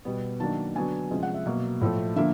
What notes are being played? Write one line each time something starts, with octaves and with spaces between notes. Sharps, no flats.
B2 G3 B3
D#3 F#3 A#3 D4 A5
D3 F#3 B3 D4 G#5
C3 F3 G#3 C#4
F#5
E5
B2 F#3 A#3
A2 F3 A3
D3 F3 A#3 E5